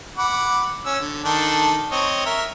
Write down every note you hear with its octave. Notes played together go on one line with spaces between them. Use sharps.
F#5 B5 D6
C#4 E6
D3
D#3 D4 A4
C4 C#5 D#5
A#4 E5